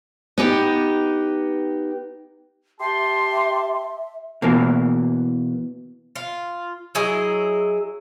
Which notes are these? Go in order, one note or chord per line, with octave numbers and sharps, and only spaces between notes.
B3 D#4 G4
G4 E5 A5 C6
B2 E3 A#3
F4
F#3 E4 G#4 D#5